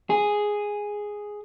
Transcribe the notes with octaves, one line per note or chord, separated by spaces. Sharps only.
G#4